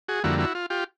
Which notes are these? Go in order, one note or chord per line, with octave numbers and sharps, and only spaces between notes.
F#4 G#4
F2 D3 G3 A#3 E4 F#4
E4 F#4
F4
F4 G4